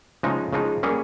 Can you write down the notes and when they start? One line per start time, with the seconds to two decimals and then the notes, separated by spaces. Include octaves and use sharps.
0.23 C#3 F3 G#3 D#4
0.53 C#3 F3 G#3 D#4
0.83 G3 A#3 C#4 G#4